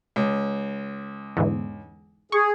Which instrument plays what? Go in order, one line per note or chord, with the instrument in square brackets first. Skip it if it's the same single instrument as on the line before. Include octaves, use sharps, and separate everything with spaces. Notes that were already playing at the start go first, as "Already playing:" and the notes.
[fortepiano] C#2
[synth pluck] E2 G#2 D3
[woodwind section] G#4 [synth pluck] C#6